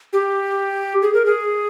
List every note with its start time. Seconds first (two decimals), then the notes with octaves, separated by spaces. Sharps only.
0.13 G4
1.02 G#4
1.14 A#4
1.26 G#4